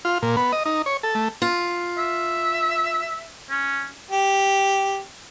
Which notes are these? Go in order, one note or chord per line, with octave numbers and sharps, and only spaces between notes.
F4
A#2
B3
D#5
D#4
C#5
A4
A3
F4
E5
C#4
G4